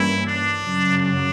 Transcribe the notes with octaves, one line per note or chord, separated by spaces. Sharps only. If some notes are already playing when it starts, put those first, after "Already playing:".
Already playing: G2 E3 G3 A#3 C#4 E4
D4
F#2 C#3 F#3
D4